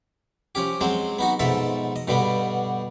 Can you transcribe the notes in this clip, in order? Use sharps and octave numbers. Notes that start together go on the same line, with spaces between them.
F3 C#4 G4
F#3 G#3 C4 C5
B3 D#4 F#4
G#2 B2 F3 A4 E5
D#5
G2 B2 D3 G3 B3